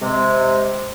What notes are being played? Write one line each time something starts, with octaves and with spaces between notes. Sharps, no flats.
C3 G#3